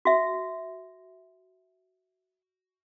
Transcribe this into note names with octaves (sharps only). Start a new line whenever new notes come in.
F#4 E5